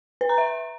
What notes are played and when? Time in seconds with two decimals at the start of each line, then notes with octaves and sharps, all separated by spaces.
0.21 B4
0.29 A#5
0.38 E5